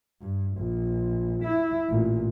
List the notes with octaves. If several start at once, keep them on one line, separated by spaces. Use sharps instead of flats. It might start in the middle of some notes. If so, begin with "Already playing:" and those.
G2
A#1
E4
A1 A#2